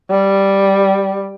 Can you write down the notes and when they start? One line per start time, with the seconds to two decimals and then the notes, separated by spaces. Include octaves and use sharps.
0.11 G3